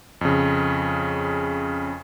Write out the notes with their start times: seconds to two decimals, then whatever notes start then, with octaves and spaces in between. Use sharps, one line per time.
0.21 F2 C#3